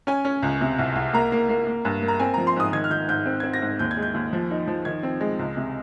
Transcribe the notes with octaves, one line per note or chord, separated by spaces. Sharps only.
C#4 G#5
C#4
C#2
C3
C2
C2
A#3 A#5
A#3
A#3
A#3
G2
A#3
A#5
C4 G#5
F3 A#5
C6
G#2 D#6
D#3 G#6
F6
D#3 G6
G#2 G6
C4
C4 G#6
A#6
G#2
D#2 G6
G#6
G#3
G6
D#2
F3
D#4
F3
D#3 G#6
C4
G#3
C#2
C3